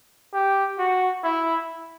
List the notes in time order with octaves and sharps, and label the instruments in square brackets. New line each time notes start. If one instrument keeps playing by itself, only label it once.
[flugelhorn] G4
F#4
E4